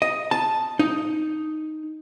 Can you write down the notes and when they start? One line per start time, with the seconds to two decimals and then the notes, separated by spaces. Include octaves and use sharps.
0.02 D#5
0.31 A5
0.79 D#4